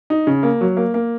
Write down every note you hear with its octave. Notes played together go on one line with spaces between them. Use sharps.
D#4
C#3
A#3
F#3
A#3
A#3